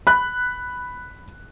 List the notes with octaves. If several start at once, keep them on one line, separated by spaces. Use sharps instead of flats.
B5 F#6